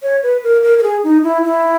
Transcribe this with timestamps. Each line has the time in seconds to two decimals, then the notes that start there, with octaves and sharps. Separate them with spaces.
0.03 C#5
0.23 B4
0.44 A#4
0.63 A#4
0.78 A#4
0.83 G#4
1.04 D#4
1.24 E4
1.44 E4